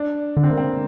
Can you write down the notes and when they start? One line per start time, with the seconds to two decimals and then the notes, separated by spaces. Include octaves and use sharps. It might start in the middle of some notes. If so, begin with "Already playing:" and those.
Already playing: D4
0.37 D3 D4
0.43 C4
0.51 A#3
0.57 C4